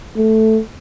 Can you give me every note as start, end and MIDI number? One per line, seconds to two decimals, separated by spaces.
0.17 0.60 57